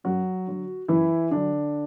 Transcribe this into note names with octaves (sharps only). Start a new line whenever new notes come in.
F#2 F#3 F#4
D3 F#3
F#2 E3 E4
D3 F#3 D4